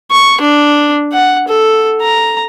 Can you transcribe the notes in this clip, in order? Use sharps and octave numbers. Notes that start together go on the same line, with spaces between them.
C#6
D4
F#5
A4
A#5